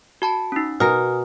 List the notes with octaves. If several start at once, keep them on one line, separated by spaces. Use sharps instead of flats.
F#4 A5 B5
C#4 D#4
B2 A#4 G#5 D#6 F6